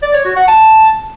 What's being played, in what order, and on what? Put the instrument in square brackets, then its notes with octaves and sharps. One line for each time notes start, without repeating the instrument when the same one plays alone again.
[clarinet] D5
C#5
F#4
F#5
A5